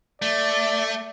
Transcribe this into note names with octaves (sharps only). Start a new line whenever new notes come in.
A3 D5